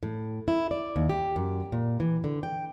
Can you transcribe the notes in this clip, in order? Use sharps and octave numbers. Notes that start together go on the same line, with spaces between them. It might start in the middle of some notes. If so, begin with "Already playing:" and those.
A2
E4
D5
D#2
G4
F#2
A#2
E3
D3
G5